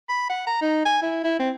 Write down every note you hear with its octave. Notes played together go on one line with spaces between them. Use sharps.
B5
F#5
A#5
D#4
G#5
E4
E4
C4